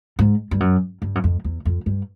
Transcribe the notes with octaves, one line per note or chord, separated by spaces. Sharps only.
G#2
G2
F#2
G2
F#2
F2
E2
F2
G2